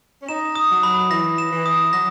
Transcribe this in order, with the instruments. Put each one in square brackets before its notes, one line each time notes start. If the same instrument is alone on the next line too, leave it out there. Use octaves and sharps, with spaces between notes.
[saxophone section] C#4
[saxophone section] D#4 [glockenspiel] E7
[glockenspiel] D#6
[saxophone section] F#3
[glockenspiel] B5
[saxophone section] E3 [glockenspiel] A#6
[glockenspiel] E7
[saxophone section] E3
[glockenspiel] D#6
[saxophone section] F#3 [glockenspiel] A#6